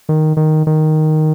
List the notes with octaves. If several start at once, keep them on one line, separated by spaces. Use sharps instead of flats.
D#3
D#3
D#3